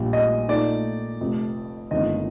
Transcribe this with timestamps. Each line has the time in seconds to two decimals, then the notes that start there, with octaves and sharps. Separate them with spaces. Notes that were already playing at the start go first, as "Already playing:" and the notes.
Already playing: A#1 A#2 G3
0.13 D#5
0.49 A#2 A3 D#4 D5
1.20 F1 F2 C3
1.91 G1 F2 D#3 D#5